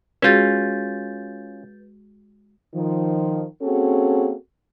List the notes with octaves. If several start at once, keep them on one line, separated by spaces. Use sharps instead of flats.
G#3 C#4 F4 F#4 G#4 B4 G6 A6
D#3 F3
A#3 C4 C#4 F#4 G#4 A4